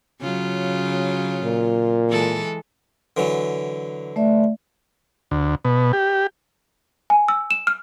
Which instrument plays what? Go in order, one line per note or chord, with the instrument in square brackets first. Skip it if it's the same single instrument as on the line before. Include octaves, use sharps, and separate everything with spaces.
[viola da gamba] C#3 F#3 F4
[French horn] A#2
[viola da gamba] E3 G#3 A4
[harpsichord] D3 E3 F#3
[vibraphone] A3 D5 E5
[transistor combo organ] D2
B2
G4
[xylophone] G#5
E6
E7
F6